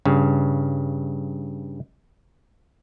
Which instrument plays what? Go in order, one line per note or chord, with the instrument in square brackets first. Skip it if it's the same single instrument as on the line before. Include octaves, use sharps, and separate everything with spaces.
[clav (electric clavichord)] G2 C#3